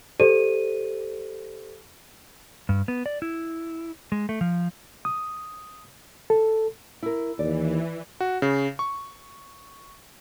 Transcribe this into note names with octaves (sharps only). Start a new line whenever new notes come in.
G4 A4 C5 D5 D#7
G2
B3
D5
E4
G#3
A3
F3
D#6
A4
E4 A#4
D#2 E3 D5
F#4
C#3
C#6